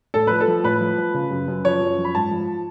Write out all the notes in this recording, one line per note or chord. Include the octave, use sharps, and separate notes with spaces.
A2 A4
F3 B4
A4
F3
A2 B4
F3
F3
C#3
F#2
F#2
F3 C#5
F#2
F3
B5
G#2 A5
F3